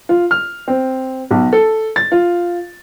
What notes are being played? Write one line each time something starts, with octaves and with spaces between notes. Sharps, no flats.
F4
F6
C4
B1
A4
A6
F4